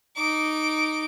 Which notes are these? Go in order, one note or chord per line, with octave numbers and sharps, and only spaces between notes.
D#4 D6